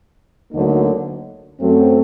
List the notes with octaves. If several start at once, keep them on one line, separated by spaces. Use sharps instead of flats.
D2 D3 F#3 A#3 D#4
F#2 F#3 A3 C4